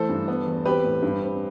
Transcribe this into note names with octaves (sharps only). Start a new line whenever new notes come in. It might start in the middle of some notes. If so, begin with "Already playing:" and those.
Already playing: E3 A3 A4 C5
G2
B3
E2
C4 G4 B4
A2
G2
C4